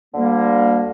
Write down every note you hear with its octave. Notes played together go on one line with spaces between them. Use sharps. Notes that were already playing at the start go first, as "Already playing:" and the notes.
D2 D3 G3 A#3